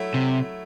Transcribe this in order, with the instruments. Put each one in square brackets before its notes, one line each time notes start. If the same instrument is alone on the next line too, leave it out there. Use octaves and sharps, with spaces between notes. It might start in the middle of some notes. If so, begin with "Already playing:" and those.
Already playing: [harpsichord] F#3 A3 E4
[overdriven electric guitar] C3